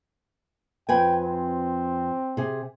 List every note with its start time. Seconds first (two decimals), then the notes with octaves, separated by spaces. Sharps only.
0.89 F2 B4 G5 G#5
1.21 C4
2.37 C3 G#4